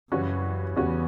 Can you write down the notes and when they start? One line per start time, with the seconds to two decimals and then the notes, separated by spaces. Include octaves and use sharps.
0.12 F#2 C#3 E3 G3 C#4 F#4
0.76 E2 C#3 E3 G3 C#4 F#4